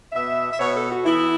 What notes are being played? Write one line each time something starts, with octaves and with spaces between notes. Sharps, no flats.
B2 B3 E5
E5
B2 B3 C#5
A4
F#4
E3 B3 E4